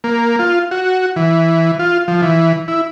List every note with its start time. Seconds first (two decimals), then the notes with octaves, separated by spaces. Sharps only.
0.04 A#3
0.39 F4
0.71 F#4
1.16 E3
1.79 F4
2.08 F3
2.22 E3
2.68 E4